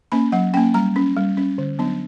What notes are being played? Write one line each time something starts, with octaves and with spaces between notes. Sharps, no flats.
A#3 C#4 B5
F#3 F#5
A#3 C#4 G5
G3 A#5
C#4
G3
C#4
D3
F#3 B3 D4